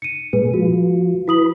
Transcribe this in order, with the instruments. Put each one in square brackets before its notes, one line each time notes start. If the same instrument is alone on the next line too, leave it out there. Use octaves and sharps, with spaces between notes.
[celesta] C#7 D#7
[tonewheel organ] A#2 G#3 [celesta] B4
[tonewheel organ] F3 [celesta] F#4
[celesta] E4 D#6 F#7 [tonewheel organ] B4